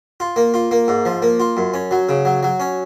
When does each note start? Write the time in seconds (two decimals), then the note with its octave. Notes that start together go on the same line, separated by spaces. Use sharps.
0.20 F4
0.36 A#3
0.54 F4
0.71 A#3
0.88 G#2
1.05 F3
1.22 A#3
1.40 F4
1.57 F#2
1.74 C#4
1.91 F#3
2.09 C#3
2.25 F#3
2.43 F#3
2.60 C#4